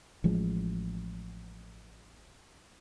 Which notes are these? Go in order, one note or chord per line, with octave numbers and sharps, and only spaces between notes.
A1 F3 G#3